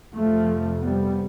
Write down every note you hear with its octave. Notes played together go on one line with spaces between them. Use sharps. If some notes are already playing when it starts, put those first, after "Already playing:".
F2 C3 F3 A3
G3 B3